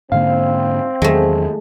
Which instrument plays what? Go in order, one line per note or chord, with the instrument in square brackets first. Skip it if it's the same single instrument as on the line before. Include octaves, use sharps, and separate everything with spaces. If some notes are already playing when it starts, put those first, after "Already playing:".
[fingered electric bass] G#2 D3 A#3 [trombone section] C4 [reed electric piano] F5
[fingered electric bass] E2 D#3 F#3 [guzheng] G#3 A3